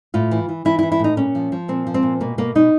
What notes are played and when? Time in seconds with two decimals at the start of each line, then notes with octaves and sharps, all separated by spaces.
0.14 A2 F4
0.31 E3
0.49 E3
0.65 E3 E4
0.79 E4
0.83 E3
0.92 E4
0.99 A2 D#4
1.17 A#2 C#4
1.35 F3
1.52 F3
1.68 A#2 C4
1.87 F3
1.94 C4
2.03 A#2
2.21 B2 A#3
2.38 B2 A#3
2.55 B2 D#4